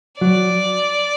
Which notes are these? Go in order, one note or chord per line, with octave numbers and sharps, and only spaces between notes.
F#3 D5